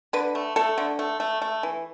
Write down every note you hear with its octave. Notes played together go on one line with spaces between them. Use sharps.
D3 B4
A3
A3 A4
D3
A3
A3
A3
E3